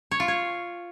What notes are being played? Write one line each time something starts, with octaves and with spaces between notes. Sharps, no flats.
C#5
F4
C#5